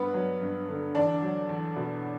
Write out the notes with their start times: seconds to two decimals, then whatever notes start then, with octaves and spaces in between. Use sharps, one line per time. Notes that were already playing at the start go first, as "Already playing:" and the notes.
Already playing: G2 B3 B4
0.14 F#3
0.42 G2
0.68 D3
0.95 E2 D4 D5
1.22 F#3
1.49 E2
1.76 B2